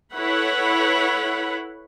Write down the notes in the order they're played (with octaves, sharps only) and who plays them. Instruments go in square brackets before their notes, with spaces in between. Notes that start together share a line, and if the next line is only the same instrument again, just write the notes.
[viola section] E4 A4 B4 C#5 F#5 B5